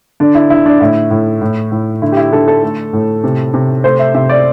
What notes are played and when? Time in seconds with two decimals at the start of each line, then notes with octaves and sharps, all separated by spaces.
0.20 D3 D4
0.35 E4
0.50 D3 E4
0.66 D4
0.81 A2 E4
1.11 A2
1.42 A2
1.72 A2
2.02 D3 E4
2.12 G4
2.17 E4
2.33 D3 A4
2.48 A4
2.63 A3
2.93 A2
3.24 C3
3.54 C3
3.84 A3 C5
3.99 E5
4.14 C3 E5
4.29 D5